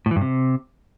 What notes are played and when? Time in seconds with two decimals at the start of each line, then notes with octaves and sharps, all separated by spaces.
0.06 A2
0.11 E3
0.16 G2
0.21 C3